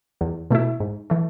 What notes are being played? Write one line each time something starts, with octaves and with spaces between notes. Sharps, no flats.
E2
B2 A3 E4
G#2
E3 A3